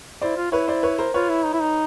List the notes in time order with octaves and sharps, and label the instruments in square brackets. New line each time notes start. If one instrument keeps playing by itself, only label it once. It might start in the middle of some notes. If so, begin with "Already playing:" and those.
[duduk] E4 [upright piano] C5 D5
[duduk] F4
[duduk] E4 [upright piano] B4 C#5
[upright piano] C5 D5
B4 C#5
A#4 C5
[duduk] F4 [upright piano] B4 C#5
[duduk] E4
D#4
E4
D#4